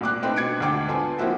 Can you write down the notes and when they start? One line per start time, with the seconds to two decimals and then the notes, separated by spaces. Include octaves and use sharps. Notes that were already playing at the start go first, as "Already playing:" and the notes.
0.01 C2 A#2 D6 F#6
0.23 A3 C4 D4 D#4 B4 G5
0.36 B2 D4 G#6 C#7 D7
0.60 D2 G#2 D4 G5 D6
0.89 B3 D4 F4 A4 C5 G#5
1.18 F3 A#3 C4 E4 F#4